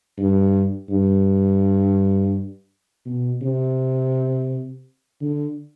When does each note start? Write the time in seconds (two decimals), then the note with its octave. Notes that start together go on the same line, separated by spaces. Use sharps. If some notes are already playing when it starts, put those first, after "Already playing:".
0.18 G2
0.89 G2
3.06 B2
3.42 C3
5.21 D3